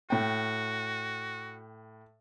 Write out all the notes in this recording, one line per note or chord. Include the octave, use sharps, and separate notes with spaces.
A2 F#4 G5